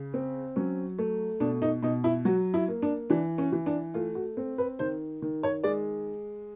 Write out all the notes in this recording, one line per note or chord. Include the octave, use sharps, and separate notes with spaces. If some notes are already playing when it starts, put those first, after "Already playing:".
Already playing: C#3
C4
F#3 C#4
A3
B2 D4
D#4
B2 D#4
E4
F#3 F#4
E4
A#3
D4
E3 D4
C#4
E3
D4
A3 F4
F#4
C4
B4
D#3 C5
D#3
C#5
G#3 D5